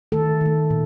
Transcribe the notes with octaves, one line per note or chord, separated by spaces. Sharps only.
D#3 A3 A4
D#3 A3
A#2